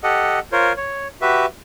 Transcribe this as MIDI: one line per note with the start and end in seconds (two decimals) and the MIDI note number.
0.03 0.39 67
0.03 0.39 69
0.03 0.39 75
0.03 0.39 78
0.52 0.73 65
0.52 0.73 70
0.52 0.73 72
0.52 0.73 73
0.77 1.08 73
1.22 1.46 66
1.22 1.46 67
1.22 1.46 71
1.22 1.46 76